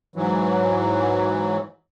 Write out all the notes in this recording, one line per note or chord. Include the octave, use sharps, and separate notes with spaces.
G#2 E3 F#3